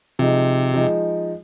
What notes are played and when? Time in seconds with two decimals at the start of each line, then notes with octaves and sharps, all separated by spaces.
0.19 C3 F3 G#3 D#4
0.74 F3 G#3 D#4